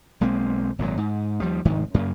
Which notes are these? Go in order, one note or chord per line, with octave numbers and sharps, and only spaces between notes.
B1 G#3 A#3 C4
G#1 G2 A#2 F#3
G#2
D#2 F3 G3
F1 D2 G#2 D#3
F#2 C#3 A#3